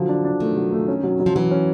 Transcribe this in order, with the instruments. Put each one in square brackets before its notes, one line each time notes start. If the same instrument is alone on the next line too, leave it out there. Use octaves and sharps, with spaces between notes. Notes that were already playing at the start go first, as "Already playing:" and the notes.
Already playing: [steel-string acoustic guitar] D3 [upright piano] F3 F#3
[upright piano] D4
D4
[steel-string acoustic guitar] D#3 [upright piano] A3
[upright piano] F#3
A3
C#4
F#3
F#3
[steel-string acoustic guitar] F3
[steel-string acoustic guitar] E3 [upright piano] F#3
[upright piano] C#4